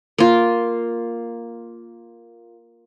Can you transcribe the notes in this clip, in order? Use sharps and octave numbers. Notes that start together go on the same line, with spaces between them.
A#3 F4